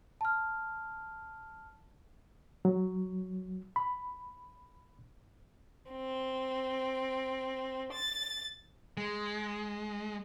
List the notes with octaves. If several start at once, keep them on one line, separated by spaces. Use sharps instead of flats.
A5 F6
F#3
B5
C4
A6
G#3